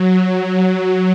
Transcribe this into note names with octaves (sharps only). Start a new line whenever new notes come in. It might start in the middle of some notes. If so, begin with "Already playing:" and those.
Already playing: F#3